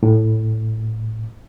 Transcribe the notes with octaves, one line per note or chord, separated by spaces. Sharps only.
A2